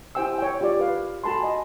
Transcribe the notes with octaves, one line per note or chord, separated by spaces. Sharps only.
E4 G4 C5 G5 G#5 E6
C#5 G5
F4 G4 D5
A#4 B4 F5
F#4 A4 A5 B5 C6
D#5 G#5